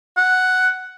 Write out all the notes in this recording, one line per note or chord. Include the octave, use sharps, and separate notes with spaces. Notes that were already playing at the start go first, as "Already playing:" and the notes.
F#5